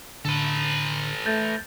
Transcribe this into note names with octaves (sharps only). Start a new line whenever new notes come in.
A2 D3 A4 B4
A3 G6 A6